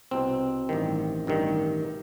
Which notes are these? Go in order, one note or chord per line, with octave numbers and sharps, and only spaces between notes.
C2 B2 C4
A1 G2 D#3
A1 G2 D#3